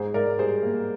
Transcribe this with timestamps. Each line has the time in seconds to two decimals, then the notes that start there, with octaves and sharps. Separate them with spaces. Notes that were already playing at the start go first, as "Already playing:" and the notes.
Already playing: G#2 G#4 C5
0.14 G#2 A#4 D5
0.39 G3 G#4 C5
0.63 A#3